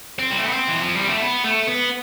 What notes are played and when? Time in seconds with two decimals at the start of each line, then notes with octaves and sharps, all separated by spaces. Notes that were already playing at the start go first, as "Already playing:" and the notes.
0.19 C4
0.31 G3
0.38 A3
0.46 B3
0.53 C4
0.68 E3
0.81 F3
0.95 G3
1.09 A3
1.21 B3
1.44 A3
1.67 B3